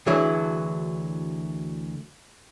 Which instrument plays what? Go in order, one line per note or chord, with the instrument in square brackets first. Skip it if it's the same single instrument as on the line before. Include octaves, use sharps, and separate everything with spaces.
[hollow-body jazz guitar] D2 D3 E3 F#3 E4 G#4